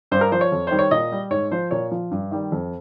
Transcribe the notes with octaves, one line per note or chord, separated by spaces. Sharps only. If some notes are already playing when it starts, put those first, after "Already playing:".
G2 C5
A#4
F3 C5
C#5
F2
D#3 G3 C5
C#5
A#2 D#5
G3
G#2 C#5
F3 C5
A#2 C#5
F3
G2
D#3 G3
F2